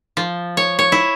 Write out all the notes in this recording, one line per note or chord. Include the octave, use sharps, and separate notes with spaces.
F3
C#5
C#5
E4